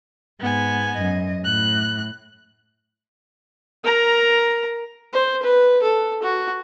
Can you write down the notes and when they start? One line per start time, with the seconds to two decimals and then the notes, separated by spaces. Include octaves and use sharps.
0.40 G#2 B3 G#5
0.94 F#2 D#5
1.44 A2 F#6
3.84 A#4 A#5
5.13 C5
5.42 B4
5.82 A4
6.23 F#4